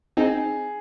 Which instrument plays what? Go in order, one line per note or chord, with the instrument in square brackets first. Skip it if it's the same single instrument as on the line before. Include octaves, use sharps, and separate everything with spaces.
[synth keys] C4 D#4 [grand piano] G#4